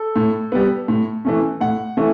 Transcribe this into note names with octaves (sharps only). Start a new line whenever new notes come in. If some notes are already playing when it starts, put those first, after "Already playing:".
Already playing: A4
A2
G3 B3
A2
E3 A3 C#4
A2 F#5
E3 A3 C#4